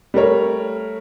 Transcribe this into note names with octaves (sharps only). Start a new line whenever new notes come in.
G3 A3 A#4 C#5